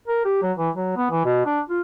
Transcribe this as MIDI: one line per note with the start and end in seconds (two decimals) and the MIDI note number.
0.08 0.25 70
0.25 0.40 67
0.43 0.52 54
0.58 0.70 52
0.75 0.92 54
0.97 1.08 59
1.11 1.22 52
1.25 1.45 47
1.46 1.60 62
1.69 1.81 65